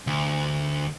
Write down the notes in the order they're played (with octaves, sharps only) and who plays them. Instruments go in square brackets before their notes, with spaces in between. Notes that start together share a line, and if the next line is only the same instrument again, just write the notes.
[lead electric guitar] D2